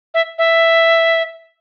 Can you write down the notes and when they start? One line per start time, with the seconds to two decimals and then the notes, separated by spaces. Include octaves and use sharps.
0.14 E5
0.38 E5